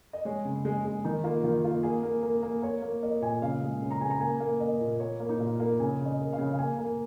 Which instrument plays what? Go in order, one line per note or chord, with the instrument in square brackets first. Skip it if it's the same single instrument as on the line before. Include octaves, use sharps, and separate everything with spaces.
[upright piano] D#5
G#3 C#5
C#3
G#3 G#4
G#3
D#3 D#4
A#3 F4
D#3 F4
A#3 F4
A#3 G#4
A#3
A#3 A#4
A#3
A#3 C#5
A#3
A#3 D#5
A#2 G#5
C#3 F5
G#3
C#3
A#5
C#3 G#5
A#5
A#3 G#5
A#3
A#3 D#5
A#2
A#3 C#5
A#3
D#4
A#2 F4
A#3
C#3 G#5
C#3
D#5
A#3
F5
C#3
F5
A#3 G#5
A#3